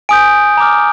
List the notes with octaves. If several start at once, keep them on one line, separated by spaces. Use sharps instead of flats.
G#5 D#6 G6 D7
A#5 D6 F6